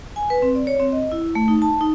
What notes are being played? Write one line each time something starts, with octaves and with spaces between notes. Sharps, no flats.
G#5
B4
C4
D5
C#5
C4
D#5
E4
A3
D#4
A5
D#4